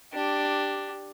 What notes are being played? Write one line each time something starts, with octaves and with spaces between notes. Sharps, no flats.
D4 G4